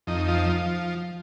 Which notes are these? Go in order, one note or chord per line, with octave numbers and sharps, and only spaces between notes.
F2 D#4
F3
F3